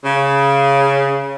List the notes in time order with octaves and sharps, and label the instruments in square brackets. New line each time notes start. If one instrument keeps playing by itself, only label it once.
[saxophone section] C#3